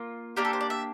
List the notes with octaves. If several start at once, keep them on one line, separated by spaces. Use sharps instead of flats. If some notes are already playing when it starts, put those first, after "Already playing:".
Already playing: A#3 F4
A#3 D4 G4 A#4
A4
C5
D5
E5